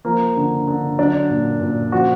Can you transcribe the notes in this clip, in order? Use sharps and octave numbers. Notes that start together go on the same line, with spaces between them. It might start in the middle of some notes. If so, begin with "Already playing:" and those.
F3 A#3
D3
D3
F#3 D4
A#2
A#2
F3 F#4